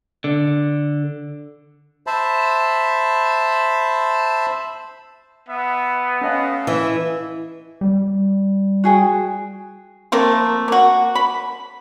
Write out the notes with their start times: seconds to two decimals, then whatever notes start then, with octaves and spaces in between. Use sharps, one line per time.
0.24 D3
2.07 C5 E5 A5 B5
5.48 B3 E5
6.21 A3 C#4 D#5 F5
6.67 E3 E5
7.81 G3
8.84 F#4 G#4 G5
10.12 F3 A3 A#3 C4
10.68 A#3 F#4
11.15 B5